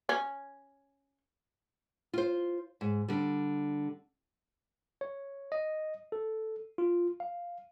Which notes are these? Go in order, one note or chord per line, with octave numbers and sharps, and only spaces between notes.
C#4
F4 C5
G#2
D3 G3
C#5
D#5
A4
F4
F5